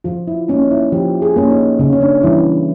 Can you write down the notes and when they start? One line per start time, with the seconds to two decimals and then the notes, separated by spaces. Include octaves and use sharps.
0.04 F3 F4
0.28 E4
0.48 A#3 C#4 D#4
0.71 E4
0.92 F3 G4
1.22 G#4
1.36 A#3 C#4
1.50 D#4
1.79 C#3 C#4
1.93 C#4
2.01 D4
2.23 E3 G3 E4